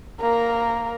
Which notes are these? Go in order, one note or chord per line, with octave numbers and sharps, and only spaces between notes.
A#3 A#4